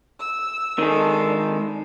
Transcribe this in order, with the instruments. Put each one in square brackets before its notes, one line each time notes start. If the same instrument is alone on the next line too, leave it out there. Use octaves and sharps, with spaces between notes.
[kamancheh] E6
[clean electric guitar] D#3 G#3 [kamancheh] D4 A4